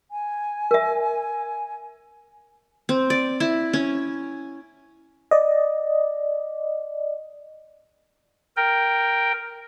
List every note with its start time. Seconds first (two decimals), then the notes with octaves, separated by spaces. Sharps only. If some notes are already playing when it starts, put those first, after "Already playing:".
0.11 G#5
0.71 A#4 E5
2.89 C4
3.10 D5
3.40 E4
3.73 C#4
5.31 D5 D#5
8.57 A#4 G5